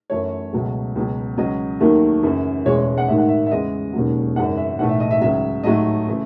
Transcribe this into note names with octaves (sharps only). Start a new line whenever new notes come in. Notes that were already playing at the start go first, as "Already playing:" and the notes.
F#2 E3 A3 C#5
C#2 B2 F#3 A3
C#2 B2 F#3
C#2 C#3 F#3 D#5
D#2 D#3 F#3 A3
F#2 C#3 E3
E1 E2 C#3 E3 G#3 C#5
C#5
F#5
A1 G#2 D#3 E5
F#5
E5
E5
E2 C#3 E3 G#3 D#5
E1 D#2 C#3 F#3
G#1 F#2 C#3 E3 G#3 F#5
E5
B1 A2 E3 A3 F#5
E5
D#5
E5
C#2 C#3 F#3 E5
A1 G#2 F#3 A3 D#5
C#3 E3 A3